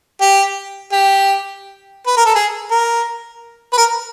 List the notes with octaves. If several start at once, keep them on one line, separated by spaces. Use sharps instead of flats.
G4
G4
B4
A#4
A4
G#4
A#4
B4
A#4